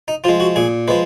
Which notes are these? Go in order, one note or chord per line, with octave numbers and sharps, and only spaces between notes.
D#4
F3 G#3 F4
F#4
A#2 G#4
F3 G#3 B4